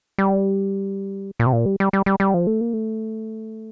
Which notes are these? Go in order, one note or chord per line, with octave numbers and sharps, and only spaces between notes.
G3
A#2
C3
A#2
G3
G3
G3
G3
G3
F3
A3
A#3
A3